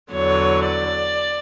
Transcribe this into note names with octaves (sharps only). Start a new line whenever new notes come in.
E2 D3 F#3 C#5
D5